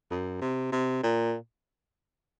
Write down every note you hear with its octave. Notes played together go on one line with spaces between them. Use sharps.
F#2
C3
C3
A#2